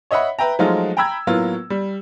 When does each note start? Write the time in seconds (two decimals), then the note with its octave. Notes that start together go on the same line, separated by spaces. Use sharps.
0.11 C#5 D#5 E5 F#5 B5
0.39 B4 E5 G5 A#5
0.59 F3 F#3 G#3 A3 D#4 F4
0.97 G5 A#5 B5 E6 G#6
1.27 A2 F#3 A#3 B3 F4
1.70 G3